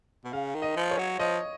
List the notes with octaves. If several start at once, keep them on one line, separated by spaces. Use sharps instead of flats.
B2
C#3 F5
D#3
D#5
F3
C#5
F#3
F3 D#5